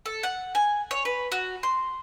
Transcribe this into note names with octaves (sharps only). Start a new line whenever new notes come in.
A4
F#5
G#5
C#5
B4
F#4
C6